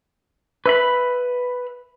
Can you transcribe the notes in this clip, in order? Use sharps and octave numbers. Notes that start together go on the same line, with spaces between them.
B4 E5 B5